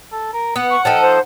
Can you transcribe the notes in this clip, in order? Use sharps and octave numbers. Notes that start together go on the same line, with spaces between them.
A4
A#4
B3 F#5
C#6
F3 D#4 A4 G5
C5